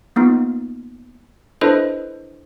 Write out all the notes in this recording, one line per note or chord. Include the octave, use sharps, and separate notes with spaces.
A#3 B3 D#4 F4
D4 E4 A4 B4 C5 D#5